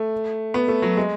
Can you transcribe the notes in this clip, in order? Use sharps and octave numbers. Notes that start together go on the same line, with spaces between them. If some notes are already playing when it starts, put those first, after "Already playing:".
Already playing: A3
B3
A3
F#3
G#3